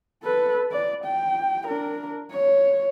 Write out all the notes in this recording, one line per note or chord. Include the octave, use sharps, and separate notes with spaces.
A4 B4
D5
G5
D4 A#4
C#5